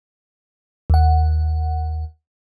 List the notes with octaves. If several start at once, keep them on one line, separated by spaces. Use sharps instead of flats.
D#2 F#5